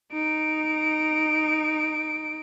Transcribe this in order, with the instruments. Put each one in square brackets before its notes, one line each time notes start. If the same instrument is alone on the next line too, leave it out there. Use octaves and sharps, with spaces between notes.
[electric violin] D#4 D7